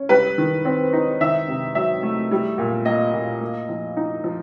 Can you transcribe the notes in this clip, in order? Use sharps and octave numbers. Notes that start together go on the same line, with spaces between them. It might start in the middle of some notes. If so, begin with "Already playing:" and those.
Already playing: C#4
G3 B4
D#3
C4
D#4
D#3 E5
C3
F#3 E5
A3
G3
A#2
A#3 D#5
A#2
A#3
F3
D#4
F3